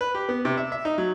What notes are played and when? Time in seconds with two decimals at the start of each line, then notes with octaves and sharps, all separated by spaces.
0.01 B4
0.15 G4
0.29 B3
0.45 C3
0.57 E5
0.72 E5
0.85 D#4
0.98 F#3